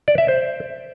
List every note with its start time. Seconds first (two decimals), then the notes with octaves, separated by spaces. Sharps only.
0.08 D5
0.18 E5
0.28 C5